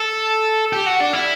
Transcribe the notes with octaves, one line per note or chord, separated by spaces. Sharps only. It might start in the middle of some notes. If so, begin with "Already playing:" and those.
Already playing: A4
G4
F#4
D4
E4